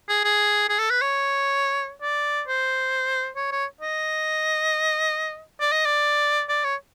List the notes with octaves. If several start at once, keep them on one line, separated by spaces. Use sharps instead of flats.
G#4
G#4
G#4
A4
B4
C#5
D5
C5
C#5
C#5
D#5
D5
D#5
D5
D5
C#5